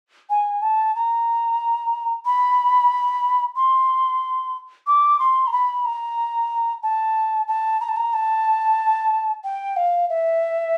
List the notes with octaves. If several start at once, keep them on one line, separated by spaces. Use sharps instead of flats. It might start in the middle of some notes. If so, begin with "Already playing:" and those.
G#5
A5
A#5
B5
C6
D6
C6
A#5
B5
A#5
A5
A5
A#5
A5
A#5
A5
G5
F5
E5